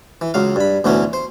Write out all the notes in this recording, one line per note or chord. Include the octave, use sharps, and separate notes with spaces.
E3
C#2 F#3 F5
G2 B5
D2 B2 E3 F#3 C#4
C5